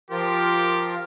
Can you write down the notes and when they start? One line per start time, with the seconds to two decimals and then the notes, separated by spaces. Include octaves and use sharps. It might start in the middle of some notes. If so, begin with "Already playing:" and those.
0.11 F3 F4 G4 A#4